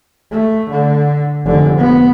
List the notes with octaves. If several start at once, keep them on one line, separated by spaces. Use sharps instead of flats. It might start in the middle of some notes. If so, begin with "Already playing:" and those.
A3
D3
F1 D3
B3